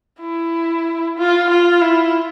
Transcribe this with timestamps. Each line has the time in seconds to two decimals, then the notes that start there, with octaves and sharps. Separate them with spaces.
0.21 E4
1.18 F4
1.50 F4
1.82 E4